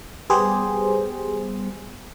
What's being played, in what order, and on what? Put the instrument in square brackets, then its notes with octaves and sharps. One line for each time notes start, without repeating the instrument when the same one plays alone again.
[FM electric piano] G3 B3 G4 G#4 C5